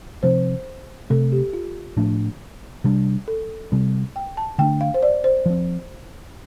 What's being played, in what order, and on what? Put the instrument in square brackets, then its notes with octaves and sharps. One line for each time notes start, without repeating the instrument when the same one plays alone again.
[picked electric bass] C3 F3 C4 [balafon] C5
[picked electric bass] C3 A3 C4 [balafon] A4
[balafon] G4
F4
[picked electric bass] A2 F3 A3 D4
C3 G3 D4
[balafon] A4
[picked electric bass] C3 G3 C4
[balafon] G5
A5
[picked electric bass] D3 A3 D4 [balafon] G5
[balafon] F5
C5
D5
C5
[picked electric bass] F3 C4